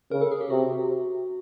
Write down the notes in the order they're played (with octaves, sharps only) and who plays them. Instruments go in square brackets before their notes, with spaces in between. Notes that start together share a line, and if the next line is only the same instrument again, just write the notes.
[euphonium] C#3 [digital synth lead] A#4
[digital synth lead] A4
G#4
G4
[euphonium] C3 [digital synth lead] F#4